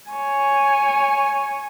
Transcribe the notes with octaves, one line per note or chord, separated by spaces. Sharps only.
C#5 G#5